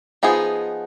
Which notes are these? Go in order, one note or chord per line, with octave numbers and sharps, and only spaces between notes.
F3 B3 D#4 G#4